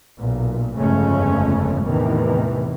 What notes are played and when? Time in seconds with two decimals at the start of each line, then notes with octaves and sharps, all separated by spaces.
0.18 B1 A#2
0.78 G1 F2 C#3 G#3 A3 C#4
1.83 E2 A2 C3 D#3 E3